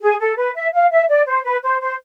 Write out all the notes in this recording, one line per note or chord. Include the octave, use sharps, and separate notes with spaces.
G#4
A4
B4
E5
F5
E5
D5
C5
B4
C5
C5